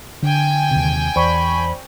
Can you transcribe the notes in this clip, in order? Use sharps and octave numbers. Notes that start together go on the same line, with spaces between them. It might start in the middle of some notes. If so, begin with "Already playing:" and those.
D3 G5 G#5
D#2 C3
E2 C5 D5 B5 C#6